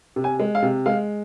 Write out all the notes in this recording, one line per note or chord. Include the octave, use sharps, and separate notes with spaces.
C3
G#5
G#3
F5
C3
G#3 F5